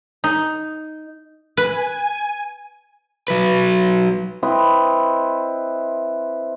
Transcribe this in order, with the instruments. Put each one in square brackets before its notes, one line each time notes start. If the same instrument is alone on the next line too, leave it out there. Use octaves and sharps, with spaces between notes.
[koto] D#4
[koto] B4 [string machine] G#5
[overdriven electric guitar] F#3 B4
[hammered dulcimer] C4 E4 B4 D#5